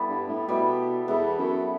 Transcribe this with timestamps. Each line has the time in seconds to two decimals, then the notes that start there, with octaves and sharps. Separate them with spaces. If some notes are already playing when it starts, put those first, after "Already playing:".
Already playing: G3 B3 E4 A4
0.09 G2
0.29 A2
0.48 B2 G3 B3 E4 A4
1.07 E2 G3 B3 E4 A4
1.38 F#2